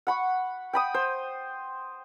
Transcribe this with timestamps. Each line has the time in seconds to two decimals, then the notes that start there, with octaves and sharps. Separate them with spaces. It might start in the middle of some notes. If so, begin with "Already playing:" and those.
0.07 F#5 B5 C#6
0.73 G5 B5 D#6
0.94 C5